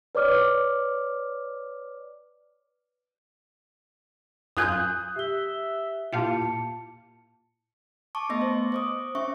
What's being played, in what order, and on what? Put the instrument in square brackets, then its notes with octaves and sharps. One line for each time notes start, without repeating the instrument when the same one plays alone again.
[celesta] B4 C#5 D5 D6 F6
[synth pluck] F#2 F4 G#5 [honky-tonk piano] D#6 F#6 G6
[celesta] G4 G7 [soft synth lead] E5
[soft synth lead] A#2 [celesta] E4 A5 C#7 [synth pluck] F4 G4 F5
[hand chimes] A5 C#6 D6
A3 B3 D#5 A#6
C5
C5 D6 D#6
C#4 E5 C#6